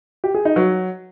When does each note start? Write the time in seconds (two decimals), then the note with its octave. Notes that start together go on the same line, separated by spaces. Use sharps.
0.24 G4
0.34 G#4
0.45 D#4
0.56 F#3